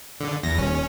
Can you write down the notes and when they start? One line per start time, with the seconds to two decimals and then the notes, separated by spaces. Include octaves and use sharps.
0.20 D3
0.43 E2 A#6
0.58 D#1 C#4